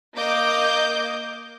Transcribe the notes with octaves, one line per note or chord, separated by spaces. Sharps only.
A#3 D#5 D6 G6